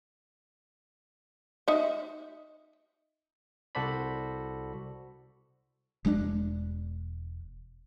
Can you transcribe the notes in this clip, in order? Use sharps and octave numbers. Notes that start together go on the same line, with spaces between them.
D#4 E5
C2 F#4 A4 C5 D5 B5
E1 G#3 A#3 D4